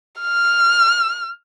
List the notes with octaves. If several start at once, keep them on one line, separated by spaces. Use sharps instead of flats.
F6